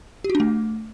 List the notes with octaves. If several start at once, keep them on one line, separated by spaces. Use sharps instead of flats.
G4
F#4
D4
A3